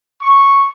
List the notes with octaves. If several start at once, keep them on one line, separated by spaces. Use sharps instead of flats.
C#6